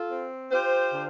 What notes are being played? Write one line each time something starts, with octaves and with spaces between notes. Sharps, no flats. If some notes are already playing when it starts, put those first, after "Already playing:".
Already playing: F4 A4
C4
F4 G4 C5
D3